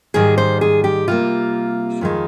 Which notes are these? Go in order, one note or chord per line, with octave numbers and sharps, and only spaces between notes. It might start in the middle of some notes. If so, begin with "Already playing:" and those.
G#2 D#3 G3 G#4
C5
G#4
G4
C3 G3 A#3 F4
F2 D#3 G#3